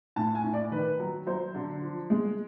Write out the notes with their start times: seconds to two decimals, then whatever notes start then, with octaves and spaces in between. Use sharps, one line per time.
0.16 A2 A5
0.35 G#5
0.44 A2
0.53 D5
0.72 D#3 B4
1.00 F#3
1.27 F#3 C5
1.55 D3
1.82 F3
2.10 G#3